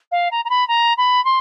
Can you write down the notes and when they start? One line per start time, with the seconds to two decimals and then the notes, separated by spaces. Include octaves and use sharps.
0.11 F5
0.31 A#5
0.45 A#5
0.50 B5
0.68 A#5
0.97 B5
1.25 C6